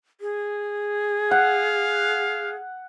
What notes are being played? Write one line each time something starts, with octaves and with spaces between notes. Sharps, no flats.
G#4
F5 F#5